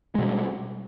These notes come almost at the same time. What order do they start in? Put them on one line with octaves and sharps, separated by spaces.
G#3 B2 G3